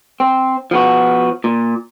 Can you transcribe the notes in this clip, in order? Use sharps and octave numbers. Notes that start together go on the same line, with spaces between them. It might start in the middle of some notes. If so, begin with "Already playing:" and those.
C4
F3 B3 F#4
A#2